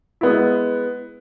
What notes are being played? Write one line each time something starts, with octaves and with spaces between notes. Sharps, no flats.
G#3 B3 E4